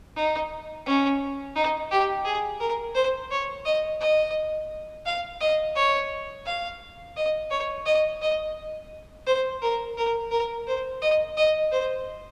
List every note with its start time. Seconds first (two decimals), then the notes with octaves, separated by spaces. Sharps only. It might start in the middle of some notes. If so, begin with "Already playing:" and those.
0.16 D#4
0.86 C#4
1.56 D#4
1.91 G4
2.25 G#4
2.60 A#4
2.95 C5
3.31 C#5
3.65 D#5
4.00 D#5
5.06 F5
5.41 D#5
5.76 C#5
6.46 F5
7.16 D#5
7.51 C#5
7.86 D#5
8.22 D#5
9.27 C5
9.62 A#4
9.97 A#4
10.31 A#4
10.67 C5
11.02 D#5
11.37 D#5
11.72 C5